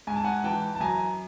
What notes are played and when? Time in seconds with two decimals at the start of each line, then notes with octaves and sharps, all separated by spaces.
0.07 G#2 G#5
0.16 A5
0.24 F#5 G#5
0.44 E3 G5 A5
0.75 A5
0.81 F#2 G#5 A#5